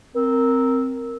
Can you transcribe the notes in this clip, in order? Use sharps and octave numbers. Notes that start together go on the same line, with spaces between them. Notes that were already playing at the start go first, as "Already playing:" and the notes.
C4 A#4